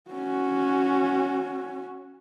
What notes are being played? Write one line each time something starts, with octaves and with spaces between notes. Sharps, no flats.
C#4 F#4